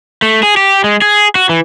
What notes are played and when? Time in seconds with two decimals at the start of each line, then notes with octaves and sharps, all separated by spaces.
0.22 A3
0.43 G#4
0.57 G4
0.84 G#3
1.02 G#4
1.35 F#4
1.49 E3